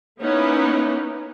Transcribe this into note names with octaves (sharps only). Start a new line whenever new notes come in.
A#3 B3 C#4 D#4 E4 B4